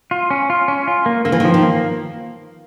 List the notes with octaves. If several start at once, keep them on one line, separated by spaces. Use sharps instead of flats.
F4
C#4
F4
C#4
F4
A#3
D3 A#3
E3
D#3 F3
D#3
A#3